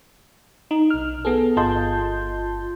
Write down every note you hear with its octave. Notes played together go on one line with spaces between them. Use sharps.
D#4
B1 F6
B3 G#4 A4
G1 F4 D#5 A5 C6 G6